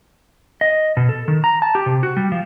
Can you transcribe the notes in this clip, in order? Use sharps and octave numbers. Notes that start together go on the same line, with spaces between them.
D#5
B2
A4
D#3
A#5
A5
G4
C3
F#4
G3
F3